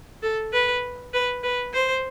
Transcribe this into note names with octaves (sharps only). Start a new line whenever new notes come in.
A4
B4
B4
B4
C5